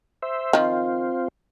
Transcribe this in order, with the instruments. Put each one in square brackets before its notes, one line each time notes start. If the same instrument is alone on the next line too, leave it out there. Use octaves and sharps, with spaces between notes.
[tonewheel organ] C5 E5
[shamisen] D#3 F3 [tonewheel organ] C4 F4